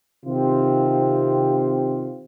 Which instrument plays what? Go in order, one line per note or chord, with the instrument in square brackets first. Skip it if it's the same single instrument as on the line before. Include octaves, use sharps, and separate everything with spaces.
[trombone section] C3 D#3 C4 F4 G4